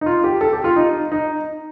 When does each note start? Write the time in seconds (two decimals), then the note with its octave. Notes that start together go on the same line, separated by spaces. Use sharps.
0.01 D#4
0.06 F4
0.24 G4
0.41 A4
0.53 G4
0.64 F4
0.76 D#4
1.12 D#4